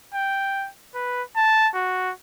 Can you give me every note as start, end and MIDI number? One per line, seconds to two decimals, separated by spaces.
0.14 0.69 79
0.95 1.22 71
1.36 1.69 81
1.74 2.12 66